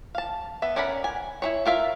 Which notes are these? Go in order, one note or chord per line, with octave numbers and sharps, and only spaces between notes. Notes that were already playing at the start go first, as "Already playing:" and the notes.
F5 A5
B3 E5
C#4 A#4 D5 F#5 B5
G#5
E4 G#4 C#5
F4 A#4 E5 F5